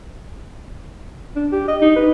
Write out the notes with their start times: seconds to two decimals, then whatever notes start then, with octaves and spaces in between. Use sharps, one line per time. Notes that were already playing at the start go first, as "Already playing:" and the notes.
1.36 D4
1.52 G4
1.68 D#5
1.82 D#4
1.96 B4